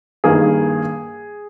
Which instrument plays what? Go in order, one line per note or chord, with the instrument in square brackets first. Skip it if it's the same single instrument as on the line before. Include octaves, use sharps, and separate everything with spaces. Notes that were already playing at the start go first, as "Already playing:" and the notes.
[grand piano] G2 D#3 A#3 G#4